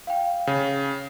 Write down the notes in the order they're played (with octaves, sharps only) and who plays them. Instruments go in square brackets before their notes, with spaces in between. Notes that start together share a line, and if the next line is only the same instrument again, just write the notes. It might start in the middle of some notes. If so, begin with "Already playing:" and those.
[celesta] F5 G5
[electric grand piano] C#3